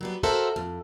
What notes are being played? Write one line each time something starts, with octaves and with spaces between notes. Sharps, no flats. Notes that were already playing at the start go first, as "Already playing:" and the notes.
F#3 G3 B3
F#4 A4 A#4 C5 E5
F2